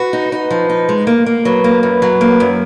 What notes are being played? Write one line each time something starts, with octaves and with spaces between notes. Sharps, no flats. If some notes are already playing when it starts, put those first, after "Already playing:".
Already playing: F#4 B4
D#4
D#4 B4
F3
D#4
G#3
A#3
A#3
F#3 B4
A#3
F#2 B4
F#3
A#3
F#2